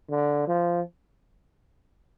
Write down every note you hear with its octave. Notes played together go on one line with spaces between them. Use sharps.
D3
F3